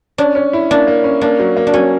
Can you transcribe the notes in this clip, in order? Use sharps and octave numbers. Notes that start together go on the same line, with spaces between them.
C#4 D4
C#4
E4
A#3 D4
A#3
C#4
A#3 D4
F#3
A#3
D4
F#3 C#4